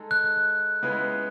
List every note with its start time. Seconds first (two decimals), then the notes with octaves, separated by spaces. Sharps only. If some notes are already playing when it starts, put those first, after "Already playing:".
Already playing: G#3 D#4 A4
0.11 F#6
0.82 C#3 G#3 B3 E4 B4